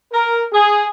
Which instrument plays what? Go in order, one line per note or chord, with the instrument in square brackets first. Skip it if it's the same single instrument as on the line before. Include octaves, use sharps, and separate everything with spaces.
[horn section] A#4
G#4